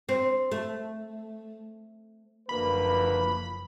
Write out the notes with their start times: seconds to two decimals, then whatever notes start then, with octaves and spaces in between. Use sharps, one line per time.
0.09 C4
0.51 A3
2.49 F#1 D2 F3 A#3 B4 B5